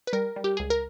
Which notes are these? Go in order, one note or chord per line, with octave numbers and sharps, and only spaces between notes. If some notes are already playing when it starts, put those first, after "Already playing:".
B4
G3 A#4
G3
G4
C#2 G#4
A#4